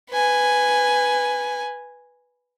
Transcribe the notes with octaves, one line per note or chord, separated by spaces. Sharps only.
B4 G#5